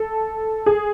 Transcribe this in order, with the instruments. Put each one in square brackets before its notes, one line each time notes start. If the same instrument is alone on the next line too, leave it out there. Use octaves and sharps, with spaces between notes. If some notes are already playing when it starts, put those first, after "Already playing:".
Already playing: [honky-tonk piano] A4
G#4